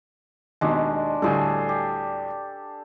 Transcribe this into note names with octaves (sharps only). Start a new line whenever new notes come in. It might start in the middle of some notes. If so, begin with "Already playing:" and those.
D#2 B2 G#3 D4
D2 A2 G3 G#4 A4
G4